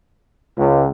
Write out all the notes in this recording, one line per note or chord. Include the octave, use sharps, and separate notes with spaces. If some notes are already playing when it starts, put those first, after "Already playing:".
C#2